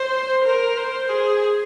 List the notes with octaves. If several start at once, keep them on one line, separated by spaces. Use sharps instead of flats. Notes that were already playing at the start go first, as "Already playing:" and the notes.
Already playing: C5
A#4
C5
G#4